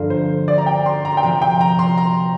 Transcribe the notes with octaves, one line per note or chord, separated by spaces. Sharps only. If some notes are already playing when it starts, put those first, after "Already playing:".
Already playing: G2 D3 F3 A#3 F4
C5
D5
A#5
G5
C6
A#5
G5
C3 F3 C4 A#5
G5
A#5
C6
A#5